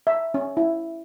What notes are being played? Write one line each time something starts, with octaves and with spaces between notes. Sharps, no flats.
E5
C#4
E4